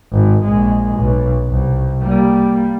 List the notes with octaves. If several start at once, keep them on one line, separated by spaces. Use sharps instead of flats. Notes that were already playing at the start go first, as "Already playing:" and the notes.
G#1
A#1 G#3
B1
C2
G3 A#3